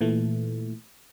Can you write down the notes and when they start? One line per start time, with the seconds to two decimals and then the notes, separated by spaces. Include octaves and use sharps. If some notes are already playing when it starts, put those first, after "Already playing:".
0.01 A#2 E3 A3